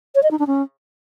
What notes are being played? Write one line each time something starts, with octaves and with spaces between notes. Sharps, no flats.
C#5
D#5
D#4
D4
C#4